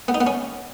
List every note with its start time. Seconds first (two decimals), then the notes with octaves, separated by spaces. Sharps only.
0.08 B3
0.14 D#4
0.21 B3
0.27 C#4